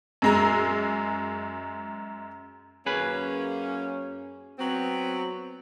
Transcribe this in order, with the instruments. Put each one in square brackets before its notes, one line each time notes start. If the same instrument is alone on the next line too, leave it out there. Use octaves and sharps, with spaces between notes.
[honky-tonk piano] F#2 G#3 A#5
[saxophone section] F#2 A#3 C#4 [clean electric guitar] G#4 B4
[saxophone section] F#3 B3 C4